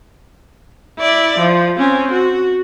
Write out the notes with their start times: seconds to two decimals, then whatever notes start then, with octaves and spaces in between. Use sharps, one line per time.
0.99 E4 D5
1.39 F3
1.78 C4 C#4
2.11 F#4